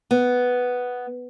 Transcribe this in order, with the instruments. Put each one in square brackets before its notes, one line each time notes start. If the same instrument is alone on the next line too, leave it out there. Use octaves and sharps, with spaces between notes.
[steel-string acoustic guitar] B3